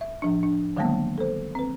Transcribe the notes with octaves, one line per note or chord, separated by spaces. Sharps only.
E5
A2 F3 D4
D4
D3 D#3 F#3 G#3 A#3 B3
A4 C5
C4 B4